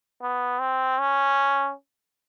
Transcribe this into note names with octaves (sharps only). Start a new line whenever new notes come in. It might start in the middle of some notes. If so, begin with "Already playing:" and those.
B3
C4
C#4